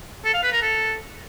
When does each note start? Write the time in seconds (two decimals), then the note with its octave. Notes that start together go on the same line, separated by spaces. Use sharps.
0.25 A4
0.34 F5
0.43 B4
0.52 A#4
0.62 A4